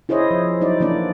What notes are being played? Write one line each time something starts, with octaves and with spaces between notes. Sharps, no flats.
E4 G#4 C5 C#5 D#5
F3
F#3 D#4 E4 D5
E3 A#3 D4 D5